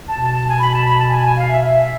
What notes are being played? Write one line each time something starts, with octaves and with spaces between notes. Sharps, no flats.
B2 A5
A5
A5
G#5
B5
A5
B5
A5
G#5
G#5
F5
E5
E5